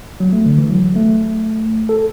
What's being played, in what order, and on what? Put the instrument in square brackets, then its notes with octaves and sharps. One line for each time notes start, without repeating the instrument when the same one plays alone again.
[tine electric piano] F#3
A3
D3
E3
F#3
A3
A4